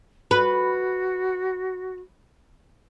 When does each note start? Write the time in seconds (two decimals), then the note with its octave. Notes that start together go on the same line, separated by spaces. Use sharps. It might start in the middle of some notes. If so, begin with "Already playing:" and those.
0.31 F#4 B4